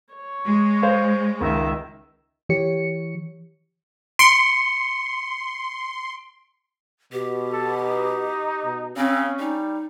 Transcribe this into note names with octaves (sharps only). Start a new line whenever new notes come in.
C#5
G#3
C5 F5
C#2 D#3 E5
E3 G4 C#5 C#7
C6 C#7 D7
B2 G4
A4
D#4
B2
C#3 C4 C#4
G3 D#4